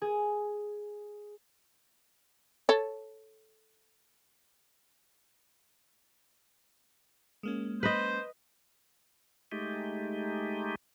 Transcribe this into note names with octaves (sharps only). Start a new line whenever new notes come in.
G#4
A4 C#5
G#3 A#3 C#4
B4 C5 D#5
G#3 A3 D#4 G4